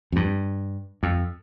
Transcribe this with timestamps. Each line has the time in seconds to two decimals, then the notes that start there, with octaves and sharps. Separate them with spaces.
0.12 F2
0.16 G2
1.03 F2